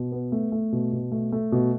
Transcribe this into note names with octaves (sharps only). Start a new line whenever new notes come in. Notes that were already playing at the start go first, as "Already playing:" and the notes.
Already playing: B2
B3
A3
A3
B2
B2
A3
A3
B2